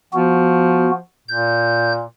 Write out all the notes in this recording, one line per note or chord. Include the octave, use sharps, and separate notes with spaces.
F3 B3 F#4
A#2 G6